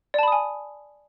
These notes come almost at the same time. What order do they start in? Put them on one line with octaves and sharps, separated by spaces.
D5 A5 B5 D#6 G#5